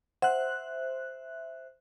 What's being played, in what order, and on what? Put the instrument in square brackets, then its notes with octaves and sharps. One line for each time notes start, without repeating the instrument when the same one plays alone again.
[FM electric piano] C5 E5 F#6 [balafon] F#5